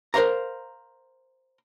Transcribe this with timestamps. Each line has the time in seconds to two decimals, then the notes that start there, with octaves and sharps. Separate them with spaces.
0.14 A#4 C5 C#5 F5 A#5